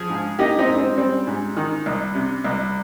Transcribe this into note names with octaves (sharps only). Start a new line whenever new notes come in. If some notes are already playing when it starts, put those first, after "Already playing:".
Already playing: F3 G#4
G#2
A#3 D#4 G4
C4 D#4
G#2
C4
G3 C4
G#2
D#3
C2
C3
C2